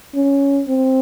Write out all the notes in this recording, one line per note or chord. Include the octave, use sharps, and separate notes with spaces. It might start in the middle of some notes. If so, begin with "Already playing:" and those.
C#4
C4